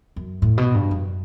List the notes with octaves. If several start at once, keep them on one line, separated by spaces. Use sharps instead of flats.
F#2
A2
B2
G2
F#2